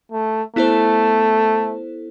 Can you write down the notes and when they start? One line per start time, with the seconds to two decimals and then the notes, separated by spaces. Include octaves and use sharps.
0.12 A3
0.56 A3 B3 E4 A4 C5